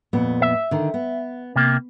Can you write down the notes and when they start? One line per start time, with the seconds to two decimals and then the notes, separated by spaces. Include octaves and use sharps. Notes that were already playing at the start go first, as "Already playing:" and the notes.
0.13 F2 A#2 B3
0.42 E5
0.71 D3 D#3
0.94 B3
1.56 C3 A#3